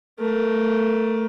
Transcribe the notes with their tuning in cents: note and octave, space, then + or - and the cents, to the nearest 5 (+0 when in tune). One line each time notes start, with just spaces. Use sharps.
A3 +10 A#4 +15